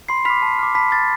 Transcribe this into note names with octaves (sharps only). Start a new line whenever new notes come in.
B5 C6 C7
B5 D6 F6 B6
A5
D6 F6
A5 B5 B6
D6 F6 A6